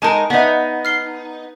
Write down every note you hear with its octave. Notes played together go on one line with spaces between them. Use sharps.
G#3 D#4 A#4 G#5 A5
B3 D#4 B4 D5 E5
F6 C7 G7